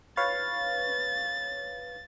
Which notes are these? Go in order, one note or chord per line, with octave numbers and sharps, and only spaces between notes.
B4 C#5 F5 A6